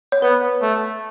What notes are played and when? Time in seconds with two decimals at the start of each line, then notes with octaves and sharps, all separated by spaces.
0.12 C#5
0.22 B3 B4
0.62 A3